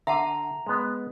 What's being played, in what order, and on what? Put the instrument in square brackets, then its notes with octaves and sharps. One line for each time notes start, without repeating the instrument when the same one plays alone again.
[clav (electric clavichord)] D3 [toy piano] E5 F#5 A5 [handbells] A#5
[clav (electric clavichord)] G#3 B3